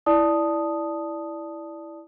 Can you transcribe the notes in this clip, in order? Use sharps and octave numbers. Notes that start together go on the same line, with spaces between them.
E4 D5 A5 D#6